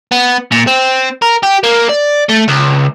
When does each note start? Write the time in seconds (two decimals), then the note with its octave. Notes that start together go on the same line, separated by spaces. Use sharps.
0.12 B3
0.52 A#2
0.67 C4
1.22 A#4
1.43 G4
1.63 A#3
1.89 D5
2.29 A3
2.48 C#2